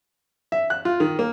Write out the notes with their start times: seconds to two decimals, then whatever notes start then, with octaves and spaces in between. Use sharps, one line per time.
0.52 E5
0.70 F#6
0.85 F4
1.00 D#3
1.19 A#3